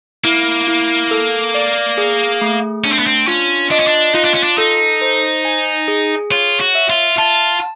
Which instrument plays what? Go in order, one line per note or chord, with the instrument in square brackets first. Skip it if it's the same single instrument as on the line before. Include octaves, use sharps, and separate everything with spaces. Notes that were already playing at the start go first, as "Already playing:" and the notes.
[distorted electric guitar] A#3 [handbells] E4
[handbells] E4
A4
D5
G#4
A3
[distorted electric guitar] C#4 [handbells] D4
[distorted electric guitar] C4
B3
C4
[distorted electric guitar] C#4 [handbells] F4
[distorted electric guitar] D4 [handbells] D#5
[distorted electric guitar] C#4
D4
[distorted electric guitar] D#4 [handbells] F4
[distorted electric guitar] D4
C#4
D4
[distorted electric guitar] D#4 [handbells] A4
[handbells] C5
G#5
G#4
[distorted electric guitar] F4 [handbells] C#5
[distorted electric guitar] F#4
[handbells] E5
[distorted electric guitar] F4
[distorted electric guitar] F4 [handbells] A5